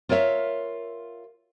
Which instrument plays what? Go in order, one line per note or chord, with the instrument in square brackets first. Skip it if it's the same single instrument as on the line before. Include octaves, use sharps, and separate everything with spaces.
[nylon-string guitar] F4 A#4 C#5 D#5 E5